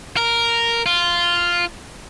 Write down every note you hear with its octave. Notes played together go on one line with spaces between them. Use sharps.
A#4
F4